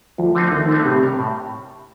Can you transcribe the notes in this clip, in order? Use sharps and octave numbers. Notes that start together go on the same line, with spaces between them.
D2 F3
D3 A3 C4 D#4
D2 D#3
D3 A3 C4 D#4
A2 C3
G3 D4 G4 A#4
A2